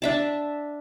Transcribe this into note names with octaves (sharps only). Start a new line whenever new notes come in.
D4 E5 A5